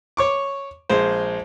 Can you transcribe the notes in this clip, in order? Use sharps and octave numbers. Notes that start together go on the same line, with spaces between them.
C#5 C#6 D6
A#1 G#3 C5